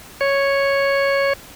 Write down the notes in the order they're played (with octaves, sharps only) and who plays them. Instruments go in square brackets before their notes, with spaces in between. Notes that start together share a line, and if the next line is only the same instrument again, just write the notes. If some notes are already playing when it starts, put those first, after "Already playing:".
[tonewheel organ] C#5